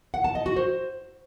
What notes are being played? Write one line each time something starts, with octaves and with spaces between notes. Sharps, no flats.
F#5
A5
D#5
F#4
C5